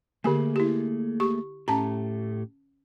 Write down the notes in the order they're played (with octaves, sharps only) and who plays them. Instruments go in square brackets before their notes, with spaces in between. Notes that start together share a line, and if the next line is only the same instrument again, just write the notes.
[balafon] D3 G4 G#5 [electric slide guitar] A3 A#3 G#4
[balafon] E4 G4
G4 C#6
[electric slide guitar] A2 A3 G4 [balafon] C#4 A5 A#5